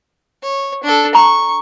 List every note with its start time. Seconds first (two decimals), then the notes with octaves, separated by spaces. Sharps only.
0.43 C#5
0.84 D4 A4
1.15 A#5 C#6